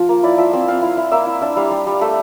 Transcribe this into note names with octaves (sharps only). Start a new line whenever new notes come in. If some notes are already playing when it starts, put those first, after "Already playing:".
Already playing: F3 F4
A#3
E4 D5
F3 E5
C4 E5
C4 F5
E4
E4
A#3 E5
E4
D4 E5
G3 F5
G3
G3
A3 E5